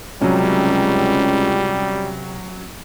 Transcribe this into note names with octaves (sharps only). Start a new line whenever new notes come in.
C#2 C3 F#3 G3 C#4